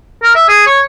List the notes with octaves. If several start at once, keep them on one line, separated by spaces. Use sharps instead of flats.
A#4
E5
G#4
C#5